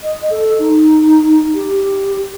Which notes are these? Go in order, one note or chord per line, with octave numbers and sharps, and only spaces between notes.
D#5
A4
D#4
G4